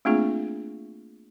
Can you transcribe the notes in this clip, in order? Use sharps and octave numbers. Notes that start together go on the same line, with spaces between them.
A3 A#3 C4 D4 F4 G#4